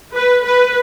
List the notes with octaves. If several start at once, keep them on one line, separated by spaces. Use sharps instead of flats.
B4
B4